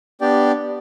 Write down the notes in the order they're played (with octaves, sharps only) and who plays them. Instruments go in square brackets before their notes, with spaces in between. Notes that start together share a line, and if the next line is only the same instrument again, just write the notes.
[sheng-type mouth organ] B3 D4 G4 D5 G5